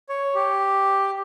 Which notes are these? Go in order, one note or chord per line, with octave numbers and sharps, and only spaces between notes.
C#5
G4